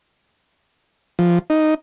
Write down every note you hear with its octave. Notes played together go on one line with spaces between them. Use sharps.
F3
D#4